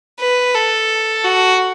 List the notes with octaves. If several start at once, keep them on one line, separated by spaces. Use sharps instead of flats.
B4
A4
F#4